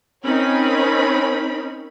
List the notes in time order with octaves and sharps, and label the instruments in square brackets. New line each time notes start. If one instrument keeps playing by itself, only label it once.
[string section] C4 C#4 D#4 A#4 C#5 B5